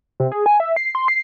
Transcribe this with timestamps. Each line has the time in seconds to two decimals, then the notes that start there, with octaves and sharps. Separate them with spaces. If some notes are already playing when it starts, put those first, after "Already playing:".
0.20 C3
0.32 G#4
0.46 G#5
0.60 E5
0.76 C7
0.95 C6
1.08 C7